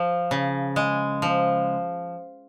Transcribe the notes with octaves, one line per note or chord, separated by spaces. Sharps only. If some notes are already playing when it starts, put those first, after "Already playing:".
Already playing: F3
C#3
G#3
F3